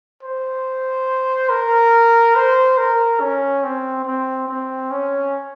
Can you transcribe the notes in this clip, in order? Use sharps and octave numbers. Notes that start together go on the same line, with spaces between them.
C5
A#4
C5
A#4
C#4
C4
C4
C4
C#4